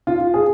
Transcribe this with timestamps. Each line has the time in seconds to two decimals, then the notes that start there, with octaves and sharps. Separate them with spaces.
0.07 F4
0.34 G#4